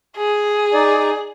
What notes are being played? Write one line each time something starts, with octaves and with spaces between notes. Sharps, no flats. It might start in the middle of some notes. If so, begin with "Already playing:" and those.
G#4
D#4 D5